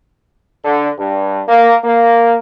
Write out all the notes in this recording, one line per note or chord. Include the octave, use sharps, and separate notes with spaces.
D3
G2
A#3
A#3